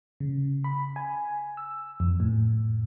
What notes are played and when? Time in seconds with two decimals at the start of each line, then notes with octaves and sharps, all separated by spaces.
0.20 C#3
0.64 B5
0.96 G#5
1.57 E6
2.00 F2
2.20 A2